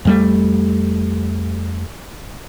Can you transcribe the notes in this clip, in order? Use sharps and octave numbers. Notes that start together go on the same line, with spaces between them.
F2 G3 A3